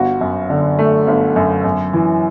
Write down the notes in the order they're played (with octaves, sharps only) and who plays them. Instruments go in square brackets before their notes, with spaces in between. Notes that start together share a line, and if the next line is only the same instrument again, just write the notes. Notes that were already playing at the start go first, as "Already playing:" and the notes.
Already playing: [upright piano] G1 F#4
F#2
D3
A3
G1
F#2
F#2
E3